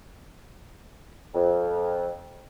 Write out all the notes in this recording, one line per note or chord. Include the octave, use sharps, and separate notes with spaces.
F2